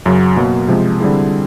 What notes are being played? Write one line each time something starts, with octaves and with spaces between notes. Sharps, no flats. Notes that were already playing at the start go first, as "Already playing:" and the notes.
F#2 C#3 F#3
B2 F#3 A#3
C3 F3 G#3
D3 G3 C4 E4 G#4